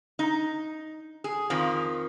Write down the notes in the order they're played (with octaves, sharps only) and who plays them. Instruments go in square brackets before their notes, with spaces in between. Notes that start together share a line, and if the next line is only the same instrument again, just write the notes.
[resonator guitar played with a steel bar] D#4
G#4
F2 D#3 F3